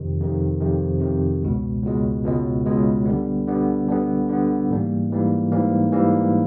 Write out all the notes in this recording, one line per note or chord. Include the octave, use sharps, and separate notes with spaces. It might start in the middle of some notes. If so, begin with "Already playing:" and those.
Already playing: F2 C3 D#3
F2 C3 D#3
F2 C3 D#3
F2 C3 D#3
C#2 B2 G#3
C#2 B2 G#3
C#2 B2 G#3
C#2 B2 G#3
D3 G3 B3
D3 G3 B3
D3 G3 B3
D3 G3 B3
G#2 E3 G3 A#3
G#2 E3 G3 A#3
G#2 E3 G3 A#3
G#2 E3 G3 A#3